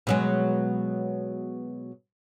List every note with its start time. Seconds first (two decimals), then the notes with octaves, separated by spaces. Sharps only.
0.07 B2 F#3 G#3